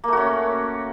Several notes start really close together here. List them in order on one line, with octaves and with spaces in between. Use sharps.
A#3 A3 F#4 C#4